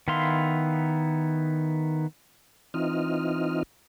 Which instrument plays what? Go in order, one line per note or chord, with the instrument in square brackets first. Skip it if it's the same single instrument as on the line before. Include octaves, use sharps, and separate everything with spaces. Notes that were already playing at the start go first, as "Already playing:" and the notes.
[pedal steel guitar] D#3 B3 E4 F5 C6
[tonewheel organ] E3 C4 D#4 F4 D#5 F6